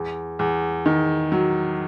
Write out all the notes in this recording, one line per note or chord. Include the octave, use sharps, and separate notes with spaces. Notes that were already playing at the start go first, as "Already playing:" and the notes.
Already playing: E2
E2
D#3
F#3